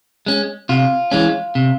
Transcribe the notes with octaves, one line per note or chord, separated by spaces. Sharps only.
G#3 C#4
C3 F4
E3 G#3 C#4
C3